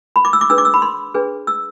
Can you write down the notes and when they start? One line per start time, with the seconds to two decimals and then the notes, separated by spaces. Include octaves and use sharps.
0.16 B5
0.25 D6
0.33 E6
0.41 D6
0.50 D4 G#4 B4 E6
0.58 D6
0.65 E6
0.74 B5
0.82 C6
1.14 D4 G#4 B4
1.47 E6